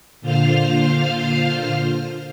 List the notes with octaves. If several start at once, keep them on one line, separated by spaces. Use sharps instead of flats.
A#2 D3 F4 C5 F5 F6